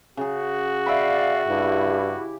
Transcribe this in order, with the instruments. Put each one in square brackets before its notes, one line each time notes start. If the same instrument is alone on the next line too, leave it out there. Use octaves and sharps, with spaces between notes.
[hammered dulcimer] C#3 G#4 [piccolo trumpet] F#4
[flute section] D5 F5 [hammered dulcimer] E5 G5 B5
[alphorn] G2 [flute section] E4 G4